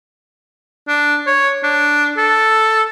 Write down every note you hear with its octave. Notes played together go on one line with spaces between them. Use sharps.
D4
C#5
D4
A4